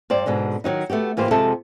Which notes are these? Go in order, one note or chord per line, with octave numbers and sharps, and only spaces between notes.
G2 C5 D5
G#2 B2 D3 G#3
D#3 E3 F#3 D#4
A3 B3 F#4 G4
G#2 E3 A#3 G4 C5
F2 C3 G#3 A4 E5 A5